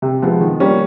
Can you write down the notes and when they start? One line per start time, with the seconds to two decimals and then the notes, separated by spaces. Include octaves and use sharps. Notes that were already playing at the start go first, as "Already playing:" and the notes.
0.02 C3
0.22 F3 G#3 B3
0.41 D#3
0.60 G3 A#3 C#4